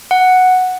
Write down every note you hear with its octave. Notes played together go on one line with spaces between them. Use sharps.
F#5